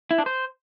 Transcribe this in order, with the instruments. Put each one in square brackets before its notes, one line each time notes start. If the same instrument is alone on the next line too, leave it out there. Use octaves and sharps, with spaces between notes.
[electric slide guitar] E4
D4
C5